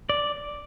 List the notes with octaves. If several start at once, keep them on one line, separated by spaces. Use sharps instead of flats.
D5